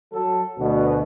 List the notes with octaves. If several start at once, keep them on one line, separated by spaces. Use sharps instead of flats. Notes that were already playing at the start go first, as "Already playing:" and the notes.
F#3 A4
D2 B2